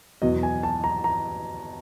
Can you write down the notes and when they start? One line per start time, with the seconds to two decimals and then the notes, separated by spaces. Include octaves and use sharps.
0.22 E2 B2 F#3 D#5
0.43 G#5
0.63 A5
0.84 A#5
1.04 A#5